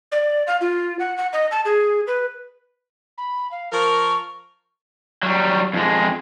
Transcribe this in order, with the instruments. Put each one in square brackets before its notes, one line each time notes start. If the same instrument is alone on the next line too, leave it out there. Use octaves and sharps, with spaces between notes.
[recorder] D5
F5
F4
F#5
F#5
D#5
A5
G#4
B4
B5
F5
[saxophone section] F3 A#4 [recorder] C#6
[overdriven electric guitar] F#3 G3
F2 G#3